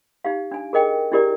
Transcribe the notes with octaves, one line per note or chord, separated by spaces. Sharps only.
D#4 G4 F5
D4 G#5
G#4 A#4 D#5 G5
D4 E4 G4 A#4 D5